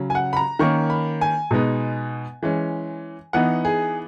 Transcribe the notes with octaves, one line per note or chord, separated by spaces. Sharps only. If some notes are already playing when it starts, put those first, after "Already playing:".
Already playing: C#3 F#3 C#4
G#5
F#5
B5
A#5
D#3 A#3 C#4 C#6
B5
G#5
B2 G#3 B3 D#4
E3 G#3 C#4
E3 B3 D#4 F#5
G#4